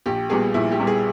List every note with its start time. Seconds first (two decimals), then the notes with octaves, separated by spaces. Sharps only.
0.06 A#1 G4
0.29 A#2 G3 B3 G#4
0.54 A#1 E4
0.72 G4
0.80 A#2 G3 B3
0.87 G#4